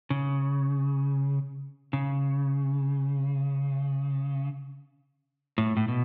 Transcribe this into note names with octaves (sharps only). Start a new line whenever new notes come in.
C#3
C#3
A2
A2
B2